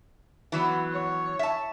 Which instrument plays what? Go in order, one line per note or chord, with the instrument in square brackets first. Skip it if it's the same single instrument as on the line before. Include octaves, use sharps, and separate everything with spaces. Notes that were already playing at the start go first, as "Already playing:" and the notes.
[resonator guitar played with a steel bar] E3 F#3 B3
[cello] C#5
[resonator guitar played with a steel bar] E5 A5